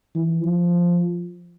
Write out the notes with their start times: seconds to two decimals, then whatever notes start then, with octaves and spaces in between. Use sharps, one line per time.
0.15 E3
0.43 F3